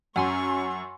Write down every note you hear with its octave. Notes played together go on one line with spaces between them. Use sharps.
F#2 C#4 F#5 G#5 C6 C#6